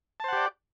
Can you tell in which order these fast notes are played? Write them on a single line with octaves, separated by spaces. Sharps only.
A5 C5 F#5 G4 D5